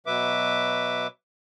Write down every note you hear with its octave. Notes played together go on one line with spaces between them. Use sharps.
B2 F#3 B4 E5 D6